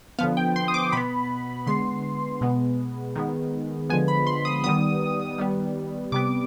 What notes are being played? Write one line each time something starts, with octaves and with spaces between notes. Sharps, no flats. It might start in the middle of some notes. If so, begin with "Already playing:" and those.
D3 F3 B3 F5
G5
C6
D#6
D6
B2 B3 B5
D3 G#3 B3 C6
B2 G#3 B3
D#3 G#3 B3
D3 F3 G#3 B3 G#5
B5
C6
D#6
D#3 G3 B3 D#6
D#3 G3 B3
C3 G3 B3 D6